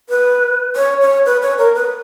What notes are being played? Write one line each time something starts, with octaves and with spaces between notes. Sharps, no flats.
B4
C#5
C#5
B4
C#5
A#4
B4